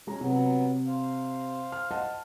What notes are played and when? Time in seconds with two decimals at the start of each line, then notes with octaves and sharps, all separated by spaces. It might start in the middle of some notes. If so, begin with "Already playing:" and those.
0.07 G#3 C#4 A#5
0.21 C3 F#3 B3
0.87 C5 F5
1.72 F6
1.91 D#5 F#5 A5